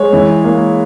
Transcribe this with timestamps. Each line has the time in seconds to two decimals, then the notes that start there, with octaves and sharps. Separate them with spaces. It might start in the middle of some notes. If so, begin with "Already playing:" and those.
Already playing: G#3 C#5
0.13 E3
0.44 A#3